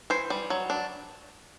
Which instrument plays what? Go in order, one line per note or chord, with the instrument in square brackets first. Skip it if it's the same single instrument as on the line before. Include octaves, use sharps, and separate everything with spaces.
[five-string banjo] E3 C5
G3
F#3
D4